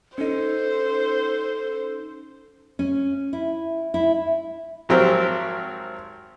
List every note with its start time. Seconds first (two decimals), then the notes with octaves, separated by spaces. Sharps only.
0.18 C#4 D#4 A4 C5
2.79 C#4
3.33 E4
3.94 E4
4.89 G#1 F#3 C4 G4 A#4